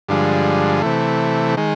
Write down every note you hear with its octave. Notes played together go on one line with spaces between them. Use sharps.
G2 D3 F3 G#3
C3 E3 A3
D#3 G#3